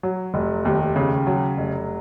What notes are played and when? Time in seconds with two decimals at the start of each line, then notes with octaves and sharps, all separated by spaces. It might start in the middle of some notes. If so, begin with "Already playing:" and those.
0.03 F#3
0.34 F1
0.65 D#2
0.96 C#3
1.27 F#3
1.58 F1